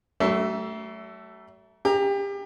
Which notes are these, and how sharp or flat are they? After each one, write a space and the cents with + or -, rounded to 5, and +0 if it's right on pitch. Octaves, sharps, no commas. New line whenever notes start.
F#3 +45 A3 +0
G4 +30 A#5 +10